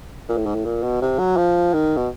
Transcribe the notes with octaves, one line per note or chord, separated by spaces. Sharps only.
A#2
A2
G#2
A2
A#2
B2
C3
F#3
F3
D#3
B2